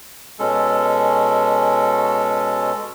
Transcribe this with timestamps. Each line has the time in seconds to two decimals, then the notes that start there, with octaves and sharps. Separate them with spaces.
0.39 B2 G#3 C#4 A4